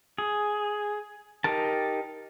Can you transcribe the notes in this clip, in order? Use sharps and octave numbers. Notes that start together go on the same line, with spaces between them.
G#4
D#4 G4 A#4 A5